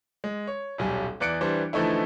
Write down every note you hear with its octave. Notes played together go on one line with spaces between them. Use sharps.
G#3
C#5
D#1 B1 G3 G#5
E2 E3 D5 F#6 C#7 D7
E3 G3 D4 C5
D3 E3 F3 A3 D#4 E4